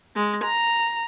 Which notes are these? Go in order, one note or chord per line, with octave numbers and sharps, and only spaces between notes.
G#3
A#5